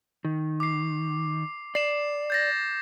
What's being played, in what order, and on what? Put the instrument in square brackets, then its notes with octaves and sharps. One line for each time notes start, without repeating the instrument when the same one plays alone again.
[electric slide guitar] D#3
[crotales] D6 C7
[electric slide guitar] D5 [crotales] C7 E7
[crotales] G6 A6 A#6